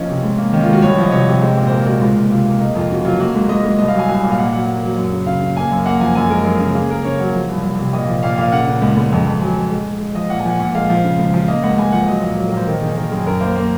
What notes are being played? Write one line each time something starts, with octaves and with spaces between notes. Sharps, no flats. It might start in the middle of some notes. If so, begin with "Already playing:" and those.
Already playing: F3 A#3 C#4 D#4
C3
G#2
A#3
D#3 C#4
F4
G#2 F#4
C2 C#5
F3
D#5
C3 C#5
C3
G#3 C5
A#2
C5
A#2 A#4
G#3 F#4
C#2 F4
A#3
C3 F4
A#3
A#3 D#4
F2 F4
C#3 F#4
F#3 F4
A#3 F#4
G#2
G#2 D#5
G#2
C2 D#5
F5
F#3 G#5
C2 G#5
A#2
F5
A#3 F#5
F#3 F#5
A#3
F#3
F#2
C#3
C#3 F5
C#3
A#3 G#5
F#2
A#3 F#5
F3 G#5
F#2 G#5
G#3 A#4
F#2 G#4
C#3
A#3 G#4
A#3 A#4
C#3 C#5
F#3 F#5
F3
C2
C2
C3
A#2 D#5
F3
A#2 F5
A#2 F5
C#3 F#5
C#3
C#2
C#2
F2
F2
F#3 G#5
F#3
G#3
G#3
G#3
F3 D#5
A#2 F#5
G#5
F3 F#5
A#2 F#5
G#3 F5
F3
C#3
C#2
F3
A#3 D#5
C#2 F#5
C#2 G#5
F3 F#5
F#3 D#5
A#2
F#3
A#4
A#2 C5
D#3 A#4
D#3 G#4
D#3 A#4
F#2 G#4
F#2 A#4
A#3 C5
A#3